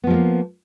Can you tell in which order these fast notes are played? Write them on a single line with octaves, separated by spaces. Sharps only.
B3 F3 G#3 A#3